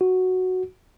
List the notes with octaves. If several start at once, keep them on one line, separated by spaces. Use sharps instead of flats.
F#4